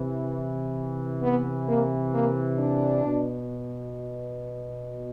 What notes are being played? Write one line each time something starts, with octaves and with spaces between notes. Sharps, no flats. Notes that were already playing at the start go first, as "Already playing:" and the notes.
Already playing: C3 E3
B3
A#3
A#3
D4
B2